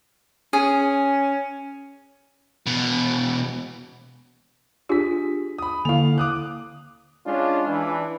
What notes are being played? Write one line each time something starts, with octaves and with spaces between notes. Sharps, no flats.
C#4 G#4
E2 B2
D4 F4 G4 G#4 B6
B5 D#6
D3 A#3 E4 F5 F7
D6 D#6 F#6
G#3 C#4 D4 F4
E3 D4